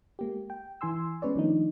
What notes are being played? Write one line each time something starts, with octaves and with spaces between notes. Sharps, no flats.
G#3 A#3 G4
G5
E3 E4 G#5 C6 E6
G#3 B3 C#4 B4 C#5 D5
D#3 F3 A3 D4 D#4